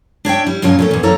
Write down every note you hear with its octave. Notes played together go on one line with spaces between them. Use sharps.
D4 C#5 E5 G5
G3 E4
F#2 A#2 C#3 F4 C#5 A5
A#2 A3 C#4
E2 E3
F#2 A#3 E4 A4 C#5 A#5